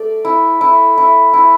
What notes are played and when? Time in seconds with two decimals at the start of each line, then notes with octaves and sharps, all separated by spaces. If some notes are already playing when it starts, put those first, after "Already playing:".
Already playing: A3 D5
0.25 E4
0.61 E4
0.98 E4
1.33 E4